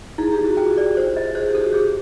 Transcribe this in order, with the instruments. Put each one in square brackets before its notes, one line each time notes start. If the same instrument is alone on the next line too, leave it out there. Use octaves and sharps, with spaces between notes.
[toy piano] E4 [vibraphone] G#4
[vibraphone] G4
[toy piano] E4
[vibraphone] F#4
[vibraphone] F4 [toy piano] G5
[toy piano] D5
C5
D#5
[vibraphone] G#4 [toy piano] C5
[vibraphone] G4
[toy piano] A4
[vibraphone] F#4
[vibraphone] G4 [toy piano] G#4